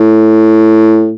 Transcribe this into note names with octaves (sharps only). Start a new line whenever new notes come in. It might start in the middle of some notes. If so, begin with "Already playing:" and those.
Already playing: A2